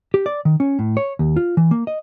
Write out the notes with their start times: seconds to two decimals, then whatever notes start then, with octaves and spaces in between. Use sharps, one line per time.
0.14 G4
0.26 D5
0.45 D#3
0.60 C#4
0.79 A2
0.97 C#5
1.19 D#2
1.37 F4
1.57 E3
1.71 A#3
1.87 D#5